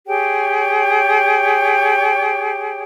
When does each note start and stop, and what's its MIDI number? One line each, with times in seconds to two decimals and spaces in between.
0.07 2.84 67
0.07 2.84 68
0.07 2.84 73
0.07 2.84 79